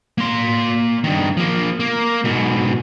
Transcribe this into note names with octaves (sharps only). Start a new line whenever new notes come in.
A#3 C6
G2 D#3
F3 A#3
A#3
G#2 B2